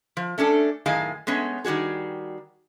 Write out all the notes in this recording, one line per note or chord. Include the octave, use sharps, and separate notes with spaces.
F3
A3 C#4 D4 A4
F#2 A2 D#3 G#4 F5 G#5
G#3 A3 B3 C#4
D#3 G3 C#4 F#4 G#4